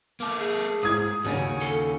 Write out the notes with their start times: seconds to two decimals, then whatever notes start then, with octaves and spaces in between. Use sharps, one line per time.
0.20 A#3 A4 D6
0.39 G#4
0.83 G#2 D#6 G#6
1.24 D#2 C#3 C#4 F#4
1.61 A4